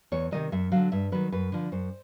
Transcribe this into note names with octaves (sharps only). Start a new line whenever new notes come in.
E2 C#5
C3 D#3 F#3 D#5
F#2 E5
D3 F#3 F5
G2 E5
D#3 F#3 B4
F#2 B4
D3 F3
F#2 C5